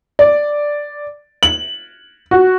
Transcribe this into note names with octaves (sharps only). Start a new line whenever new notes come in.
D5
F#7
F#4